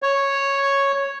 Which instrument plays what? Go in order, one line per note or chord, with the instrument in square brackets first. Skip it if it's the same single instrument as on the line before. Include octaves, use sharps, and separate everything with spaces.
[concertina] C#5